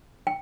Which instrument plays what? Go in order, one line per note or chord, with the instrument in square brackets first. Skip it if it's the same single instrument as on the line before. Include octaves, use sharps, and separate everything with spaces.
[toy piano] G5